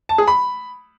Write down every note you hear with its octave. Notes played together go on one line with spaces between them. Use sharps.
A5
G#4
B5